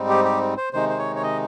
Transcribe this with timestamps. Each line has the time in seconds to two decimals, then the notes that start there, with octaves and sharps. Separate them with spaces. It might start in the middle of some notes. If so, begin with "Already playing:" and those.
Already playing: G#2 G3 C4 D#4
0.09 G4
0.25 G4
0.57 C5
0.73 C3 D#3 G#3 D#4 C5
0.89 C5
0.99 C#5
1.16 C#5
1.23 D#5